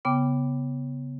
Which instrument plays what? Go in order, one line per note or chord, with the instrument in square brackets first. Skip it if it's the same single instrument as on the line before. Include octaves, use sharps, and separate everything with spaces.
[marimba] C#3 B3 G5 D6